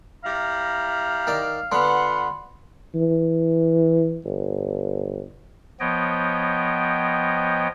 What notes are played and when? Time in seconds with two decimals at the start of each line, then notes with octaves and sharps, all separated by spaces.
0.24 G3 E4 F5 A#5
1.27 D#3 D5
1.72 D3 B3 F4 B4 F#5 B5 C6
2.95 E3
4.25 G1
5.80 F3 B3 C#5 D#5 G5